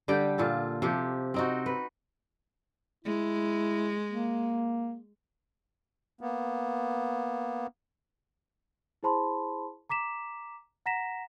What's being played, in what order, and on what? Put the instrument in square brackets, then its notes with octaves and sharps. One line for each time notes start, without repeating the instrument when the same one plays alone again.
[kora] D3 G3 G4 G5
A#2 F4 A4
C3 F3 G4
C4 D#4 F#4
B4
[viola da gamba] G#3 [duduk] E4
[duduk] A#3
[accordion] A#3 B3
[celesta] E4 G#4 C5 A5 B5 C6
A#5 D6 B6 E7
F#5 A#5 A#6 B6 E7